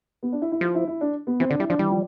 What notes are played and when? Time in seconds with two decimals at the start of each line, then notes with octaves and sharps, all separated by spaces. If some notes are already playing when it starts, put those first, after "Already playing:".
0.23 B3
0.32 D4
0.42 E4
0.52 E4
0.61 F3 F4
0.75 E4
0.88 E4
1.01 D4
1.27 B3
1.40 E3 C4
1.50 D3 D4
1.59 G3 E4
1.70 F3 D4
1.79 E3 G3
1.90 F3